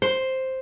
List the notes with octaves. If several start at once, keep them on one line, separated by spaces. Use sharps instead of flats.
C5